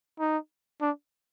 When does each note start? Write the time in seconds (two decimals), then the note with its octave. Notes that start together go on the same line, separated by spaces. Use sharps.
0.19 D#4
0.81 D4